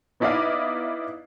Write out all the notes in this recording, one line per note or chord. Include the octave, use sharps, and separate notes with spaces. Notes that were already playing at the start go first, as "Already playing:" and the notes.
B3 D#4 E4 D5 D#5 F5